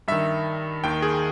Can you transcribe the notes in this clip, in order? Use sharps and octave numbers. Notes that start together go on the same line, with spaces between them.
G2 D#3 E5
D#2 D#3 G5
G#4